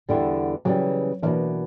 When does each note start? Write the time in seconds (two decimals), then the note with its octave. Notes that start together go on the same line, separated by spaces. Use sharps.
0.09 E2 D3 G3 B3 E4
0.65 C#3 E3 F#3 G3
1.22 B2 E3 A#3 D4